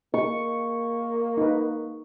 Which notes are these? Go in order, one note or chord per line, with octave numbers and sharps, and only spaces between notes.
A#3 C#6
D#4 A#4 B4